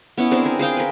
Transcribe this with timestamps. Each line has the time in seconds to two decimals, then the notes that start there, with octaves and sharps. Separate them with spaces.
0.18 B3 C#4 E4
0.31 C4 D4 G#4 A#4
0.45 A#4 G#5
0.59 G#4 C5 F5 G5
0.77 A#4 B4